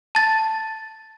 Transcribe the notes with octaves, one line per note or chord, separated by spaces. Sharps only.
A5 A6